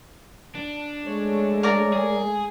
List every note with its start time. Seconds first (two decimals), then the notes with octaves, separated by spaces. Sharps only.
0.55 D4
1.06 G#3 A3 C#5
1.63 A#4 D5 A#5
1.93 G#4